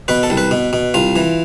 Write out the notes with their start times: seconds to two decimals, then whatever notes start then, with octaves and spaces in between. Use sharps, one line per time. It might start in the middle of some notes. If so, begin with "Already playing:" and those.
0.08 B2 B4
0.23 A4
0.30 C2
0.37 B4
0.51 B2
0.73 B2
0.94 C2 F4
1.16 E3